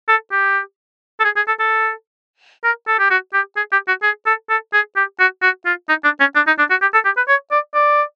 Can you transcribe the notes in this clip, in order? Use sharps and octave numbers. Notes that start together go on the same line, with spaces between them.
A4
G4
A4
G#4
G#4
A4
A4
A#4
A4
G4
F#4
G4
G#4
G4
F#4
G#4
A4
A4
G#4
G4
F#4
F#4
F4
D#4
D4
C#4
D4
D#4
D4
F#4
G4
A4
G4
B4
C#5
D5
D5